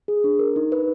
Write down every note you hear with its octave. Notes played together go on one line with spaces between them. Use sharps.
G#4
D4
A#4
D#4
B4